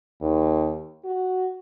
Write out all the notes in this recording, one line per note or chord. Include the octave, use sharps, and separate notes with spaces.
D#2
F#4